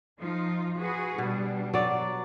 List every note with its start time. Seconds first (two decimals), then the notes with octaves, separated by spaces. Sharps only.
0.18 F3 D#4 F4
0.77 F#4 G#4 B4
1.18 B2 G3 D4
1.74 F#3 D5